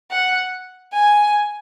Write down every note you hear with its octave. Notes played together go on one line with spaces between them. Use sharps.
F#5
G#5